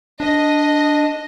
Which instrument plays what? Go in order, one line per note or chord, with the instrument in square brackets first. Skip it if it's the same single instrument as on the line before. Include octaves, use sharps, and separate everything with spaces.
[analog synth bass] D4 [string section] D#5